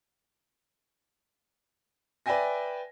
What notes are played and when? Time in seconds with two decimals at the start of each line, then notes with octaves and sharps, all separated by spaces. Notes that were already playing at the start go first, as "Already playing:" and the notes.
2.26 B4 D5 E5 G5 G#5 A#6